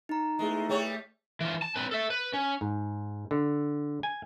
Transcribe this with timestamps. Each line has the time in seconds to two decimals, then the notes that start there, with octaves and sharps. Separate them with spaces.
0.09 D#4 A#5
0.39 E2 G#3 A3
0.69 G3 B3 C#5
1.41 E3 F4
1.62 A5
1.76 C4 B4
1.91 A4 E5
2.10 B4
2.33 C#4
2.61 G#2
3.31 D3
4.03 G#5